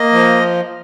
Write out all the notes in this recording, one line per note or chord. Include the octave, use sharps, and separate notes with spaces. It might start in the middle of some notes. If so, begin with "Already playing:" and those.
Already playing: A#3 D#5
F3